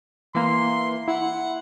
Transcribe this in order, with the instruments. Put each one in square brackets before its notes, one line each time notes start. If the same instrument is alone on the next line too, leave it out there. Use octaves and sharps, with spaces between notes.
[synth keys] E3 A#3 [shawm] C6
[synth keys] E4 [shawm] F#5